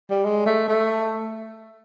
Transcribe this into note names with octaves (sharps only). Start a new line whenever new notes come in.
G3
G#3
A3
A3